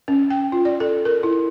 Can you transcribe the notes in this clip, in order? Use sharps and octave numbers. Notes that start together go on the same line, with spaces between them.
C#4
G5
F4
D5
A4
A#4
E4